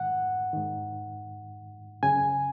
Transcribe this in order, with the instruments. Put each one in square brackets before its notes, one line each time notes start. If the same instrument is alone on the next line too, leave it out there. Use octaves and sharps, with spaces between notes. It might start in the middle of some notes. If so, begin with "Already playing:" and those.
Already playing: [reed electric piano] G#2 D#3 F#5
G#2 D#3
F#2 C#3 G#5